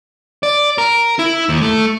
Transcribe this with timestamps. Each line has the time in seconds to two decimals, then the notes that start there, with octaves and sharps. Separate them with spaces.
0.43 D5
0.78 A#4
1.19 E4
1.49 D#2
1.62 A3